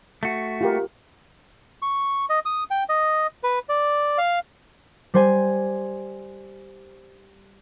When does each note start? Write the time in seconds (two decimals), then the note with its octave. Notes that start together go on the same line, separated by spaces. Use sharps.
0.23 A3 F#4
0.61 F4 G4 A#4
1.82 C#6
2.30 D#5
2.45 D#6
2.71 G5
2.89 D#5
3.43 B4
3.69 D5
4.18 F5
5.14 G3 C5 G#5